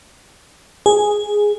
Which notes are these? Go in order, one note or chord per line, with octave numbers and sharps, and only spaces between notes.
G#4